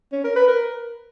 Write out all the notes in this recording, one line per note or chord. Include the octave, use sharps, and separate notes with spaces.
C#4
A#4
B4
A#4